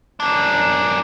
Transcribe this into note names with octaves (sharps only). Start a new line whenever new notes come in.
F#2 D4